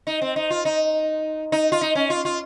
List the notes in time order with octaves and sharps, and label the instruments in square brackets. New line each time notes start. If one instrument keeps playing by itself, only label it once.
[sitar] D#4
C4
D#4
F4
D#4
D#4
F4
D#4
C#4
F4
F4